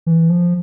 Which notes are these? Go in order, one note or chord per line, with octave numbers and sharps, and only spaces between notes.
E3
F3